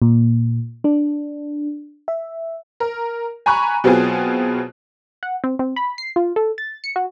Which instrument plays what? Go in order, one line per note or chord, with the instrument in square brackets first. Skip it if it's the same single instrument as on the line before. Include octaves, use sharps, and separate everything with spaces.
[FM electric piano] A#2
D4
E5
[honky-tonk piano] A#4
G#5 A#5 B5 C#6 F#6
B2 F#3 B3 C4 F4 G#4
[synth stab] F#5
C4
C4
B5
C7
F4
A4
A6
C#7
F#4